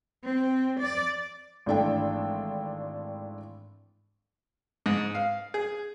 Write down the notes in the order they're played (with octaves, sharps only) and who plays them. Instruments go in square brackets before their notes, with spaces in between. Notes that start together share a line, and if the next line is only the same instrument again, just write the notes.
[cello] C4
D5
[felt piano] G#1 E3 A3 D4 A4 G5
[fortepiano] G#2
F5
G#4